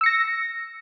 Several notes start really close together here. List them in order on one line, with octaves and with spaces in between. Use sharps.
E6 C#7 A#6